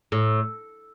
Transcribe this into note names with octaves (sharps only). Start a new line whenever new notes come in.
A2